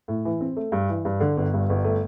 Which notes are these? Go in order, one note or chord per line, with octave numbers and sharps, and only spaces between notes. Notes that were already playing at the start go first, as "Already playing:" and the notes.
A2
E3
C4
A3
G2
E3
G2
D3
G1
G2
G1
A3